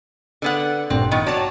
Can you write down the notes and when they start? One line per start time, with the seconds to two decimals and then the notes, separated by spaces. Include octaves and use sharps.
0.42 D3 B3 F#5
0.90 A1 G2 A#2 C4
1.11 D#3 B3
1.26 F#3 C#5 D5 A5